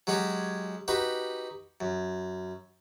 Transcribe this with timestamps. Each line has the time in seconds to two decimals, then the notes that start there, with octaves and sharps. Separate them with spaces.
0.07 F#3 G#3 C#4 F#4 G4
0.88 D#4 F#4 G4 B4
1.81 F#2